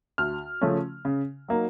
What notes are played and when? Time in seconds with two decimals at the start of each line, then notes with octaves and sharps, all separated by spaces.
0.18 D2 F6
0.61 C#3 F3 A3 C#4
1.05 C#3
1.48 F#3 A#3 D#4